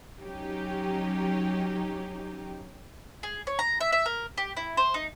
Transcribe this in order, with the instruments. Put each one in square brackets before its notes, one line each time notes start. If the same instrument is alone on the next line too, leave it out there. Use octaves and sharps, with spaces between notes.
[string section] F#3 C#4 D#4 G4
[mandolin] G#4
C#5
A#5
E5
E5
A#4
G4
E4
C5
D#4